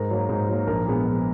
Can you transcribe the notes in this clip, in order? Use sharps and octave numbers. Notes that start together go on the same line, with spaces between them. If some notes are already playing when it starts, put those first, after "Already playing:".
Already playing: G#2 A#4
F#3 A#3
G#2
F#3 A#3
A#1 A#4
A#2 G#3 B3
A#1